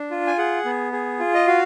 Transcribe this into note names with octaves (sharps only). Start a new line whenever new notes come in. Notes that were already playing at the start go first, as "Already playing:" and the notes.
Already playing: D4
F4
G#5
G#4 F#5
B3
G#4
F4
D#5
F#4 F5